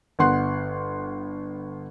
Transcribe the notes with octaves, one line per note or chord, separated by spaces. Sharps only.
G1 F#5 C6 F#6